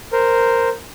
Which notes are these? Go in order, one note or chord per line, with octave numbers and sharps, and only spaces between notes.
A#4 C5